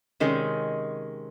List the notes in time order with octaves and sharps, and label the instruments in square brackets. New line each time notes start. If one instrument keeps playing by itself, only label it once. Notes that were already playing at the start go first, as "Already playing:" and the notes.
[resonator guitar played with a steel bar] C3 D#3 G#3 C#4